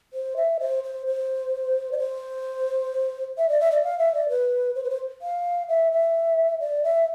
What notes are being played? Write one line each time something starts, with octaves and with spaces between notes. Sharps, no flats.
C5
E5
C5
C5
C5
D5
C5
E5
D5
E5
D5
F5
E5
D5
B4
C5
B4
C5
F5
E5
E5
D5
E5